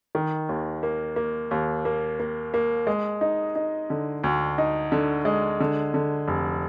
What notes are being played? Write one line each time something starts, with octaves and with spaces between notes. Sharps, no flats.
D#3
D#2
A#3
A#3
D#2
A#3
A#3
A#3
G#3
D#4
D#4
D3
D2
D#4
D3
G#3
D3
D3
F1